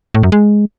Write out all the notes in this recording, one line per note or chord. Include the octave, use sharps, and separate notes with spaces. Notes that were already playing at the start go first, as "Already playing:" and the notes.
A2
F#2
G#3